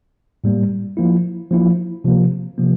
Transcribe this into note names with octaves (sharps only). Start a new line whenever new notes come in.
A2 G3 A#3
F3 A#3 E4
F3 A#3 E4
C3 F3 A#3
C3 F3 A#3